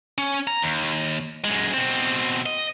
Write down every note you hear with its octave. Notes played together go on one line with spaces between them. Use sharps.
C#4
A#5
D#2
F#2 G#3
B2 C4
D#5